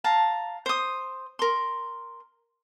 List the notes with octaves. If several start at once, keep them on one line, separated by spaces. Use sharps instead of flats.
F5 A5 A#5
C5 D#6
A#4 C6